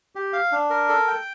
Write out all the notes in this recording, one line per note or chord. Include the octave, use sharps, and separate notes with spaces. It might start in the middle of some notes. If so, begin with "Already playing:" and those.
G4
F5
D4
A#4
A4
G5